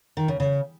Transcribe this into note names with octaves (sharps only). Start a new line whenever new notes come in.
D#3
C#3
C#3